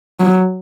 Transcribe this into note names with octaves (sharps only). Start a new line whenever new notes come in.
F#3